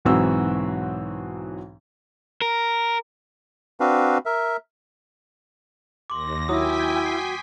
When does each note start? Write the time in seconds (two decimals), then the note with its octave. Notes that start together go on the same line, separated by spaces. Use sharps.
0.05 B1 G#2 E3 C4 F#4 E6
2.42 A#4
3.80 C4 D4 F#4 B4 F5
4.26 A#4 E5
6.10 D#2 C6 D6 A#6
6.49 F#3 E4 G5 G#5 D#6 B6
7.06 C7